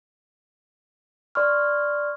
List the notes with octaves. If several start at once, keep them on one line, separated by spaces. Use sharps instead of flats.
D5 C6 C#6 F6